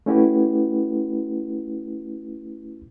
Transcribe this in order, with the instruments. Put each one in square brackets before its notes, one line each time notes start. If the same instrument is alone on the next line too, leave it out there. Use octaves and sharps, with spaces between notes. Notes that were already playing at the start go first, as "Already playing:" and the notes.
[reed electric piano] A3 C#4 E4 F#4 G4 B4